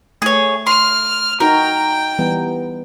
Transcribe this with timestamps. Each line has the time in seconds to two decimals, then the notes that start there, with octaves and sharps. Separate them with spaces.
0.22 A3 G#4 C#5
0.67 C6 F6
1.40 D#4 F#4 A#4 G5
2.19 E3 G3 B3